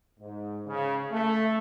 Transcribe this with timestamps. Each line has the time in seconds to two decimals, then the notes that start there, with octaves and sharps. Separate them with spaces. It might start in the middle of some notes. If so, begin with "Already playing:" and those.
0.20 G#2
0.67 C#3
1.12 A3